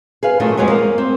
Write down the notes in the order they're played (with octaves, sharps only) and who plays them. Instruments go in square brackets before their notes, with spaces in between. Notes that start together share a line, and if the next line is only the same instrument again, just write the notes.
[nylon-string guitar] G#4 B4 F5
A#2 D#3 F#3 A3 C#4 F4
F2 B2 G#3 C#5 F#5 G#5
A#3
C4